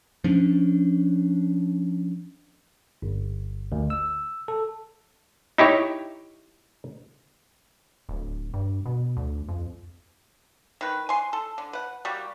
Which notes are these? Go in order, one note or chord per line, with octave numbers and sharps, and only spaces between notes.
F3 C#4 D4
G1
D2
E6
A4
D#4 E4 G4 C#5
D1
G2
B2
D2
F2
D#3 B4
G#5 C6
A4
D3
B4 F#5
G3 A#3 F#4 G4